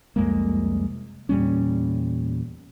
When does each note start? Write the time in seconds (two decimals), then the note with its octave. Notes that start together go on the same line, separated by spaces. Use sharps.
0.16 C2 F2 G#3 A#3
1.29 E2 A#2 G3 C#4